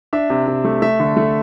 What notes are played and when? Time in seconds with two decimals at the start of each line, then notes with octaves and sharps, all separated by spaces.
0.13 D4 E5
0.30 C3
0.47 C3
0.65 A3
0.82 A3 E5
1.00 D3
1.17 A3